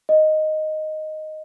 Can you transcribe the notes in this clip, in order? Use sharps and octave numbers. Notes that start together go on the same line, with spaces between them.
D#5